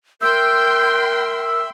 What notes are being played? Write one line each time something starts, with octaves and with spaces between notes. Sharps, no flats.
A#4 E5 G5 C6 E6 G6